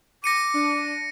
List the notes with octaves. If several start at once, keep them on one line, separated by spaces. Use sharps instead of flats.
D6 A#6 C#7 D#7
D4